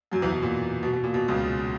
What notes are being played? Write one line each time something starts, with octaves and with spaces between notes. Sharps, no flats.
F#2 F#3
E2 E3
B2
A#2
B2
B2
A#2
B2
C#2 C#3